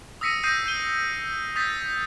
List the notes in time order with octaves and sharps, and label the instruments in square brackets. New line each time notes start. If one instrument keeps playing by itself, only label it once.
[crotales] D#6 E6 A#6 B6 C#7 D#7
D#6 G6 A#6 C7 D#7
G6 D#7 G7
D#6 G6 A6 B6